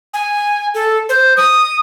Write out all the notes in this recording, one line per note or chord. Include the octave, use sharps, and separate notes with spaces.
G#5
A4
C5
D#6